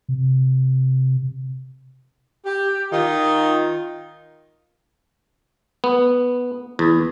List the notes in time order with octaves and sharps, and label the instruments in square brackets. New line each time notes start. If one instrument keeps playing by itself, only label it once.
[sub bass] C3
[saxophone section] G4
D#3 D#4 F4
[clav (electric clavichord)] B3
E2